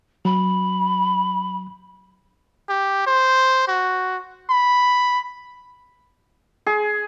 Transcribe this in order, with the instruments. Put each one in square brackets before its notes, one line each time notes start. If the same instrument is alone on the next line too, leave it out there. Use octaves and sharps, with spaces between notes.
[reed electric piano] F#3 [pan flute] B5
[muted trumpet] G4
C5
F#4
B5
[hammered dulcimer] G#4